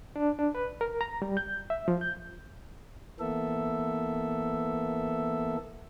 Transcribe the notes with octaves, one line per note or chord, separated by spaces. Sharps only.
D4
D4
B4
A#4
A#5
G3
G6
E5
F3
G6
E3 A#3 B3 A4 E5